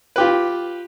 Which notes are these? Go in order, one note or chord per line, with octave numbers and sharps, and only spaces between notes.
F4 G4 B4